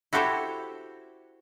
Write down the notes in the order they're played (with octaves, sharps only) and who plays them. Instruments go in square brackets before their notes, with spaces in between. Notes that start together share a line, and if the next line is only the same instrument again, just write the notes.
[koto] E4 F#4 G4 A4 C5 C#5